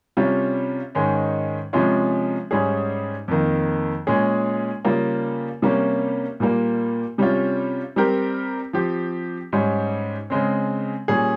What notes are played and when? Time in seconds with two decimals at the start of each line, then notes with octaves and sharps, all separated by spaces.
0.17 C3 G3 C#4 F4
0.95 G#2 D#3 G#3 C#4
1.73 C3 F3 G#3 C#4 F4
2.51 G#2 G3 C#4 G#4
3.28 F2 D#3 A#3
4.07 A#2 G#3 C#4 G#4
4.85 C#3 G3 A#3 F4
5.62 C3 G3 A#3 C#4
6.40 A#2 G3 A#3
7.18 C3 G3 C#4 F4
7.96 G3 C4 G4 A#4
8.73 F3 C4 G4
9.53 G#2 G3 C#4
10.30 C#3 G#3 C4
11.08 A#2 G3 C#4 G#4